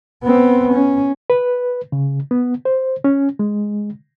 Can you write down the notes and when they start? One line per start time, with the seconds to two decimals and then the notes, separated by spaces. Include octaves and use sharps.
0.24 B3 C4
0.73 C#4
1.30 B4
1.92 C#3
2.31 B3
2.65 C5
3.04 C#4
3.39 G#3